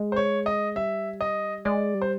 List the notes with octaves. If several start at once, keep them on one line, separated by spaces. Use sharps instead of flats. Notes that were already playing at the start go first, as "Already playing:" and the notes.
Already playing: G#3
C5
C#5
D#5
G3 E5
D#5
G#3 D5
G3
C5